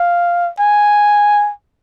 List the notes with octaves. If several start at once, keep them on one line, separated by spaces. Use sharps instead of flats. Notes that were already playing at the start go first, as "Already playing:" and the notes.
Already playing: F5
G#5